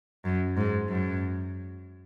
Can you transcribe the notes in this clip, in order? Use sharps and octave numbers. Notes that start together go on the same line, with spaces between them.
F#2
G#2
F#2